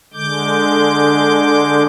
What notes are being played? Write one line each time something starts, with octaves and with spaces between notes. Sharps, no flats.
D3 G#3 D6 G6